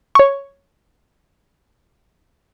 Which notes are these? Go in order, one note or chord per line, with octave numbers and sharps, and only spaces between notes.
C#5 C#6